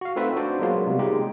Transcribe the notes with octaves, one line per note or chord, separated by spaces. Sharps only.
F#4 F5
A3 C4 D#4 F4 B4 E5
D4 F#4 C5 D5
F#3 G#3 A#3 B3 F4
C3 G3
G#3 D#4 G4